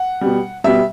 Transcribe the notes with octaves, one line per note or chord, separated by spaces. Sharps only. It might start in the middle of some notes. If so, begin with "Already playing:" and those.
Already playing: F#5
B2 G3
B2 G3 E5